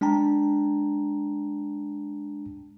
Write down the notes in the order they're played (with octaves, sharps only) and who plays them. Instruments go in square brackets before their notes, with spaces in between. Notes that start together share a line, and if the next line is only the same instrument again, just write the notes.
[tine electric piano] G#3 D4 G5 A5 A#5